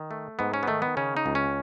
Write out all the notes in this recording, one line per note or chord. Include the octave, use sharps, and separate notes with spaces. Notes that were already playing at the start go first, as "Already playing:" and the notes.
Already playing: D#3
A3
G#2 B3
C#4
B3
D#3 A3
B3
C#3 C#4
D#4
C#2
C#4